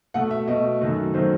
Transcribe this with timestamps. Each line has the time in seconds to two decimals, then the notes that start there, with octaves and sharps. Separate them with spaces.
0.14 B2 A3 F#5
0.31 E5
0.47 B2 A3 D#5
0.81 F#2 D#3 F#3 A3
1.14 D#3 F#3 A3 C5